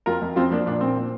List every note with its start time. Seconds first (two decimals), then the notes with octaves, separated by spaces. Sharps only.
0.06 F2 F4 A#4
0.21 F2
0.36 F3 C4 F4
0.51 F3 A#3 D4
0.66 A#2 A#3 D4
0.81 A#2 C4
0.97 F3